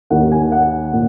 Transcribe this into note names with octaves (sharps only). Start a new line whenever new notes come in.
D#2 D#3 F#5
G#5
F#5
A#2